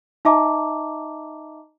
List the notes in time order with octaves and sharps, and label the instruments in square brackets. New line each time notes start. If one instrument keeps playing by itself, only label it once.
[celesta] D#4 D#5 E5 A5 A#5 D6